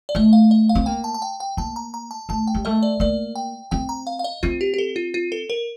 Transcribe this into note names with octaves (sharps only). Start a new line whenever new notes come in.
D5
A3 D#5
F5
D#5
F5
C4
A#3 G5
A5
A5
G5
G5
A#3 A5
A#5
A#5
A5
A3 A5
G5
G3
A3 D#5
D5
A#3 D5
G5
C4 G5
A#5
F5
F5
D#5
C4 F4
G4
G4
A4
F4
F4
A4
A#4